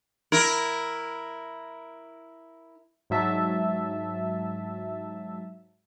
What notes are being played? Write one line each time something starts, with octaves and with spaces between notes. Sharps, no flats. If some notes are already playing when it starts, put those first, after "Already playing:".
E4 A#4
G#2 F#3 E5 A5